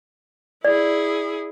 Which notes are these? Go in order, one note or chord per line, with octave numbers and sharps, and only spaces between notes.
E4 G#4 D5